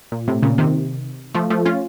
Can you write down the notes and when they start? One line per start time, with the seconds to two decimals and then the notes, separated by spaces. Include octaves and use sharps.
0.12 A#2
0.28 A2 C3
0.43 A#2 C#3
0.58 C3 D#3
1.34 F3 A3
1.50 F3 A3
1.65 C#4 F4